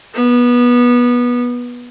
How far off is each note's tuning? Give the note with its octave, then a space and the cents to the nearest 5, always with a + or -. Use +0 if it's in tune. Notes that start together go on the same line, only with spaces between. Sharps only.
B3 -20